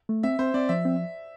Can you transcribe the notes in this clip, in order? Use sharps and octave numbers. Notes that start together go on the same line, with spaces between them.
A3
C4 E5
C4 C5
C4 D5
F3 E5
C4